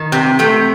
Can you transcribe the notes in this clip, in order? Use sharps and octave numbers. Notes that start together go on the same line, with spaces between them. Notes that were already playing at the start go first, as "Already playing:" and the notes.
Already playing: D#3
C3
C3 A3